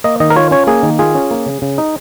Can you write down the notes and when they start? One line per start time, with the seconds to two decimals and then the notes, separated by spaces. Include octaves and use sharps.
0.04 A#3 D#5
0.20 D#3 D#5
0.30 A#4
0.36 F4 C#5
0.51 C#4 C#5
0.67 A#3 G#4
0.83 D#3
0.99 F4 G#4
1.15 C#4
1.31 A#3
1.46 C#3
1.62 C#3
1.78 D#4